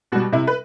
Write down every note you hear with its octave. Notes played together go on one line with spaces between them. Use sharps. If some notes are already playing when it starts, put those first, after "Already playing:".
B2 G3 F#4
C3 E4
B4